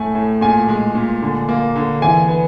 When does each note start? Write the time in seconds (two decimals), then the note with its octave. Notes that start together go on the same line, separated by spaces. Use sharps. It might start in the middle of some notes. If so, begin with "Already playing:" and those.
Already playing: A2 A3 G#5
0.15 A2
0.41 A#2 G#5
0.68 G#3
0.95 A#2
1.22 D3
1.49 A#3
1.76 D3
2.02 E3 G#5
2.29 B3